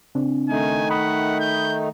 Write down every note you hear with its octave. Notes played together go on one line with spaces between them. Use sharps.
C#3 C4 D4
D#3 A3 D#4 G#5
F#5 B5 D#6 B6
G6